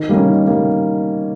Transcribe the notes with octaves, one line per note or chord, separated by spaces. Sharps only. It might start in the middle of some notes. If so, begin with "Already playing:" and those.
Already playing: D#3
G3 A#3
C#4
D#3
G3 A#3